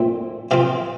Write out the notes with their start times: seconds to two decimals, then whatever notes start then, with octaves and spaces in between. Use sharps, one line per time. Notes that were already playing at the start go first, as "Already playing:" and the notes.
Already playing: A#2 F3 A3 C4 E5
0.51 C3 F3 C4 F5